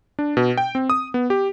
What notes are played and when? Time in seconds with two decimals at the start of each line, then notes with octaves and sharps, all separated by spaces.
0.19 D4
0.37 B2
0.58 G5
0.75 C4
0.90 D#6
1.14 B3
1.30 G4